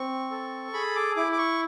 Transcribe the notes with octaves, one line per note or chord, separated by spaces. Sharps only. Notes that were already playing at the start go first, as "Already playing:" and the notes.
Already playing: C4 C#6
A4
G#4 B5
D6
E4 D6
D6
C#6